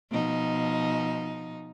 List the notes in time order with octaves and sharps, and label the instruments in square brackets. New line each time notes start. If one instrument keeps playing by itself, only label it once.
[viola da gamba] B2 F3 D#4